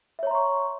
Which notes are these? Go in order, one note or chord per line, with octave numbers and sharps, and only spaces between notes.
C#5 E5 A#5 C6 C#6